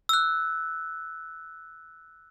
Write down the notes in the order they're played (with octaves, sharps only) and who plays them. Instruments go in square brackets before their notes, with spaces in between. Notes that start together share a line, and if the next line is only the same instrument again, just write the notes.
[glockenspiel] E6 F#6